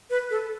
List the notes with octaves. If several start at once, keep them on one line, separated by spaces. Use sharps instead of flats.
B4
A4